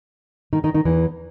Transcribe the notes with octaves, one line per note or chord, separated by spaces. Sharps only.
D#3 D#4
D#3 D#4
D#3 D#4
E2 E3